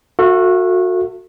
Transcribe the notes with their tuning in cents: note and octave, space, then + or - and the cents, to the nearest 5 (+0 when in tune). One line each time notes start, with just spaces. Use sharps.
F#4 -25 A4 +35 E5 +35